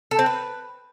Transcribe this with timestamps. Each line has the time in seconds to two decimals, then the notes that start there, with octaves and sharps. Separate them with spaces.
0.11 A4
0.19 C4
0.26 B4